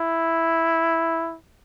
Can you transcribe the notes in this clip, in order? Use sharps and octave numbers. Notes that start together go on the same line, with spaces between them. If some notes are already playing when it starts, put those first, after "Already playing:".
Already playing: E4